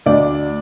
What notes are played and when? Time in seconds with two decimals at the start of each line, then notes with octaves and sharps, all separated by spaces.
0.06 D2 D5